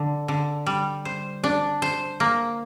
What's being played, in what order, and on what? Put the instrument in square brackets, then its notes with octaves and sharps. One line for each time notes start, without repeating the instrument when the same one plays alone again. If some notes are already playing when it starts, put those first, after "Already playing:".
Already playing: [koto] D3
D3
G3
C5
D4
C5
A#3